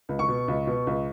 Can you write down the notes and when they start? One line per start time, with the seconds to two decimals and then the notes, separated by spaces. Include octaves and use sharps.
0.09 C#2
0.19 C#6
0.29 B2
0.48 C#2
0.67 B2
0.87 C#2